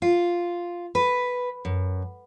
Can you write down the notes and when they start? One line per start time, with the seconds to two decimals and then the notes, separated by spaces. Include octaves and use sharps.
0.02 F4
0.95 B4
1.65 F#2